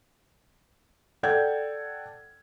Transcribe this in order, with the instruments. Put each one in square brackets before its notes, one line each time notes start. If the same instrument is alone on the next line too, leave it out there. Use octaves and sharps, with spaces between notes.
[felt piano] A4 D5 F#5 G5 G6 G#6